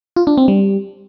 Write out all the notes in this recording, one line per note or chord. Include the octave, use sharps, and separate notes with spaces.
F4
D4
C4
G3